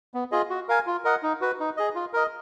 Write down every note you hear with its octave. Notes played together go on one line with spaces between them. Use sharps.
B3
F4 G#4 D#5
F#4
A#4 F5 G#5
F4
A#4 D#5 F#5
D#4
F#4 B4
D#4
G#4 D#5
F4
A#4 D#5